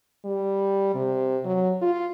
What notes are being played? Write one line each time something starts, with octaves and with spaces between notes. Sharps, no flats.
G3
C3
F#3
F4